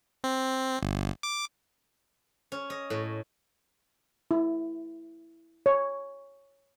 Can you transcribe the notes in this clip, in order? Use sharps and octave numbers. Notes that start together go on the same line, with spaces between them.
C4
G1
D6
C#4
D#5
A2
E4
C#5